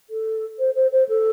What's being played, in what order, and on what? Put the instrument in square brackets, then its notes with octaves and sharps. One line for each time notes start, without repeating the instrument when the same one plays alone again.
[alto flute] A4
C5
C5
C5
A4